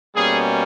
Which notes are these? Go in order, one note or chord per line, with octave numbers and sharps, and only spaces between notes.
B2 G3 A#3 C#4 G#4